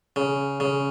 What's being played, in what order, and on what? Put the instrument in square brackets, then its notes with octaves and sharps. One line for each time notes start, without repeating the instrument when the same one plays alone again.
[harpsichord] C#3
C#3